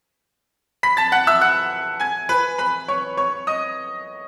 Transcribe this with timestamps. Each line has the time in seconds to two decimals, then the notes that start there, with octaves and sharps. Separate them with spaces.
0.83 B5 B6
0.97 A5 A6
1.12 F#5 F#6
1.27 E5 E6
1.41 F#5 F#6
2.00 G#5 G#6
2.29 B4 B5
2.58 B4 B5
2.88 C#5 C#6
3.17 C#5 C#6
3.47 D#5 D#6